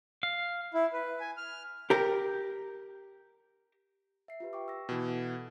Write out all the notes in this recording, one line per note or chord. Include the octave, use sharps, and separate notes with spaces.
F5
E4
B4
G#5
F6
G4 A#4
E5 C7
F4 G4 B4
G5 C#6 D6
E6 A#6
B2 E3
A4 F#5